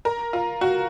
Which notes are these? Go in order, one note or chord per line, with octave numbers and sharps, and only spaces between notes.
A#4
F4
F#4